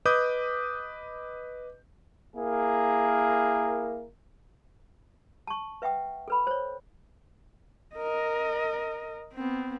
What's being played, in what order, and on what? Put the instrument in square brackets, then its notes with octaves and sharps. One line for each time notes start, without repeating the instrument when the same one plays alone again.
[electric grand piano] B4 D#5 D6 D#6 G6
[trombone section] A#3 E4 G#4 A#4
[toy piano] A5 C#6
B4 E5 F#5 G5 D#6
A4 B4 B5
C5 C#5
[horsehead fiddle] A#4 D#5
B3 C4